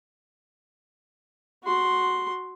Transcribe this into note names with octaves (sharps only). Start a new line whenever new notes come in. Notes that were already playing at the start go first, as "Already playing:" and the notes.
F#4 C6